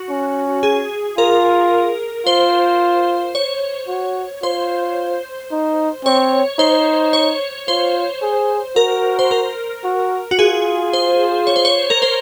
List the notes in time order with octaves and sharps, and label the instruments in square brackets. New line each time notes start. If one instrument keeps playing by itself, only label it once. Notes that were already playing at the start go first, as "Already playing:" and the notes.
Already playing: [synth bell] F#4
[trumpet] C#4
[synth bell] G#4
[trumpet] F4 [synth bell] A#4
[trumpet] F4 [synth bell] C5
[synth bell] C#5
[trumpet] F#4
[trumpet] F4 [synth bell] C5
[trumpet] D#4
[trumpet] C4 [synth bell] C#5
[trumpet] D#4 [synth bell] C5
[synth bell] C#5
[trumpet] F4 [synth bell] C5
[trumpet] G#4
[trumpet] F#4 [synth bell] A#4
[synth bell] C5
A#4
[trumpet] F#4
[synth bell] F#4
[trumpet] F4 [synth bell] G#4
[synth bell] C5
C#5
C5
C#5
A#4
C5